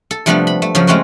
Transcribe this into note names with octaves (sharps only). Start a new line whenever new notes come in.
A4
C3 F3 G3 A3 B3 D4
B5
A3
C#3 F3 F#3
G#3 A3 C4 C#4 F#4 A#4